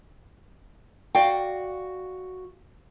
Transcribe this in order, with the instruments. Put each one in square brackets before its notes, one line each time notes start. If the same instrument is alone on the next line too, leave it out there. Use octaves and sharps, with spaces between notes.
[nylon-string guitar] F#4 D5 F5 G5